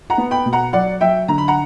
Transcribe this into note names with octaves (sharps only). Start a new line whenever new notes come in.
F#5 A#5
B3
G5 B5
B2
F#5 A#5
F#3 D5 F#5
F#3 E5 G5
D3 A#5
B5
F#5 A#5